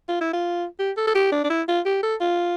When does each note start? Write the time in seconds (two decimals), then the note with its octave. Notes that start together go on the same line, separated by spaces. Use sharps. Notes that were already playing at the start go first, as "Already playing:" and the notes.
0.09 F4
0.21 E4
0.33 F4
0.79 G4
0.97 A4
1.07 A4
1.15 G4
1.32 D4
1.44 D4
1.50 E4
1.68 F4
1.85 G4
2.03 A4
2.21 F4